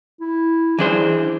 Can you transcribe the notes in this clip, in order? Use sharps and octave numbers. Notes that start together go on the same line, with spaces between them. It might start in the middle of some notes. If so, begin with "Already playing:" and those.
E4
E3 D4 G#4 C5